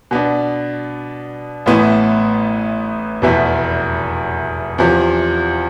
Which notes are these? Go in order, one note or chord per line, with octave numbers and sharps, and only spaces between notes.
B2 B3 D4
A1 A2 E3 B3
F1 E2 B2 B3 E4
E2 C3 F3